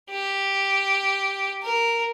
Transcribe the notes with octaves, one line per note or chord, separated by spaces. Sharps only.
G4
A#4